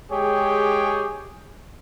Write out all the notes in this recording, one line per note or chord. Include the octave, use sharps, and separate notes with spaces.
G#3 G4 G#4 C#5 G5